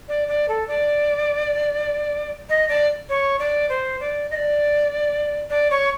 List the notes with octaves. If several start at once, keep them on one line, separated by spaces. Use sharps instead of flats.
D5
D5
A4
D5
D#5
D5
C#5
D5
C5
D5
D#5
D5
D5
C#5